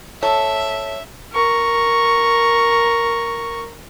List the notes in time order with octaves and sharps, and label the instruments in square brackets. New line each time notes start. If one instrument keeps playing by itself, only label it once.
[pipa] A4 [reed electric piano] C#5 [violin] E5
[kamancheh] A#4 C#6